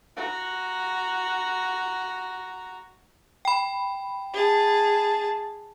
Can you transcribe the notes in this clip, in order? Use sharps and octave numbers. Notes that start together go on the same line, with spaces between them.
F#4 A#5
G5 B5
G#4 A5